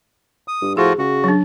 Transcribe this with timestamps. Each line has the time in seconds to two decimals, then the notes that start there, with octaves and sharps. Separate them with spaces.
0.48 D#6
0.62 G2
0.77 A2 F3 F4 F#4 G#4
0.98 C#3 F#4
1.24 F#3 D4